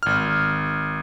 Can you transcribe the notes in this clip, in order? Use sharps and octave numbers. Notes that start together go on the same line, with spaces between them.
G#1 F6